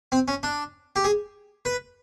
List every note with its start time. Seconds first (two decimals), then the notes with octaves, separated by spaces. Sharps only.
0.12 C4
0.28 C#4
0.43 D4
0.96 G4
1.04 G#4
1.65 B4